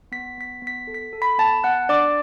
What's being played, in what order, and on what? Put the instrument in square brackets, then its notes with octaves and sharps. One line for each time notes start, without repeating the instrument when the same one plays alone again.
[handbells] B3 B6
B3 B6
B3
B6
A4
B6
A4
B5 B6
B3 A5 A6
B3 F#5 F#6
D4 D5 D6